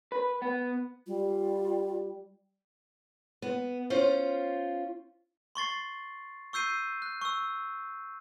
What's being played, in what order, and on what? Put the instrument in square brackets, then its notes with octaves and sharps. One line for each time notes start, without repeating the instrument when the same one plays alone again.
[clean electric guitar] B4
B3
[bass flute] G3 [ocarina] F4
[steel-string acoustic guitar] B3
C#4 F4 C5
[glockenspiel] C6 C#6 A6 C7
C#6 E6 G6 C7 D#7
F#6
C#6 E6